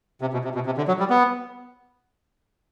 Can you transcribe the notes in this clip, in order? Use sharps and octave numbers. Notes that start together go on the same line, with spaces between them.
C3
B2
C3
B2
C3
D3
F#3
G3
B3